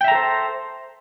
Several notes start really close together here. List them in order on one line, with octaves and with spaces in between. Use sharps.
G5 E5 A#5 A4 C5